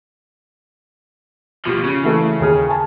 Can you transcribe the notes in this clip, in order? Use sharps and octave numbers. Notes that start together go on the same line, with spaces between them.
B2 F3 F4 G4
C#3
E3 A3
D#2 G#4 F6
G#5 A5